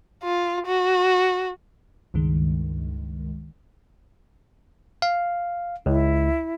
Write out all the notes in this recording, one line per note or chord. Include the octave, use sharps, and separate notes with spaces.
F4
F#4
C#2 G2 D#3 G#3
F5
C#2 E4